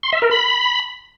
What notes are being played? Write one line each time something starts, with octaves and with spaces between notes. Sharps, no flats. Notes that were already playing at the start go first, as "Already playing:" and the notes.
C6
E5
A#4
B5